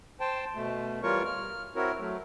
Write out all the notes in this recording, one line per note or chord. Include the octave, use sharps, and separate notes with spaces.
C5 G5 A5
B2 A3
E3 G3 F4 A#4 C#5 C#6
F6
C4 E4 F#4 A#4 C#5
F#3 A3